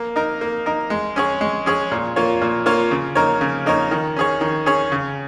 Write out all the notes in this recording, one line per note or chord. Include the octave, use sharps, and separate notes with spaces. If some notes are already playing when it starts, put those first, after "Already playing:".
Already playing: A#3
D#4 A#4
A#3
D#4 A#4
G#3
C#4 G#4 C#5
G#3
C#4 G#4 C#5
A#2
A#3 F4 C#5
A#2
A#3 F4 C#5
C#3
A#3 D#4 A#4 C#5
C#3
A#3 D#4 A#4 C#5
D#3
C#4 G#4 C#5
D#3
C#4 G#4 C#5
C#3